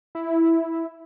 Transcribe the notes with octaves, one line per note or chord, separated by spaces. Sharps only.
E4